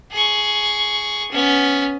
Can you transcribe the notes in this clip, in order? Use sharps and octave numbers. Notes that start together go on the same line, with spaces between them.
G#4 C#6
B3 C#4